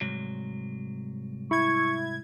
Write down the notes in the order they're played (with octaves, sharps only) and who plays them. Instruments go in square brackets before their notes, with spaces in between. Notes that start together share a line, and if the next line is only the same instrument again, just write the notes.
[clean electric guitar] C2 G#2 F#3
[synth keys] E4 G#6 [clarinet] C#6